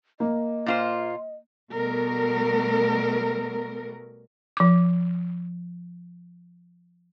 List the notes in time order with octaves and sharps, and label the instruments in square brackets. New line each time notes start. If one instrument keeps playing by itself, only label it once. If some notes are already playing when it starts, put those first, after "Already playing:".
[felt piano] A#3 [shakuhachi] D#5
[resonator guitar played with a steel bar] A#2 F4 C5
[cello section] B2 G3 A3 B3 A#4
[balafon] F3 D6